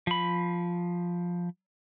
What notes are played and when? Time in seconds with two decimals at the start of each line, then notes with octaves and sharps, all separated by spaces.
0.07 F3 B5